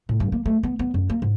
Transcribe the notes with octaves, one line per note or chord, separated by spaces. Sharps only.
A2
G2
A#3
A3
B3
B3
F#2
A#3
G#2